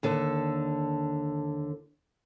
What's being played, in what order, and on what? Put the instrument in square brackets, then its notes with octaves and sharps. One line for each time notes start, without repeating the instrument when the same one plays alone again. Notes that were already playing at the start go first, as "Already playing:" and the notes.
[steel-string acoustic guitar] D#2 D3 A4